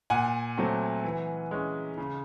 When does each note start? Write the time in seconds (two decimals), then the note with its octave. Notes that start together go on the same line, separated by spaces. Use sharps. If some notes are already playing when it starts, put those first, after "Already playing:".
0.10 A#2 F#5 G#5
0.58 F#3 A3 C4
1.04 E3
1.51 G#3 C#4
1.98 C#3